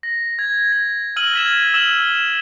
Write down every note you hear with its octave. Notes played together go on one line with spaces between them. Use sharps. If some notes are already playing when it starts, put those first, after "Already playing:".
A#6
G#6
A#6
E6 F6 D#7 F#7
G#6 B6 E7
E6 E7 F#7 G7